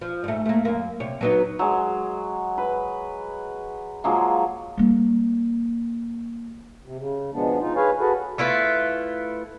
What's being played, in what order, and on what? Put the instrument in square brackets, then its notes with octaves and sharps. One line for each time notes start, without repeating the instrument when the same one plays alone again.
[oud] F3
G#2 A3
A3 A#3
F#2 A#3
C3 C#5
F#3 B3 D#4
[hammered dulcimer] F#3 G#3
B4
F3 F#3 G#3 A#3
[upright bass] G3 A#3
[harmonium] C3
C#3
B2 F3 G#3 B3 D4
D#4 F4
G#4 B4 C#5 F5 G#5
F#4 G#4 A4 B4
[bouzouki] A3 E4 F4 B4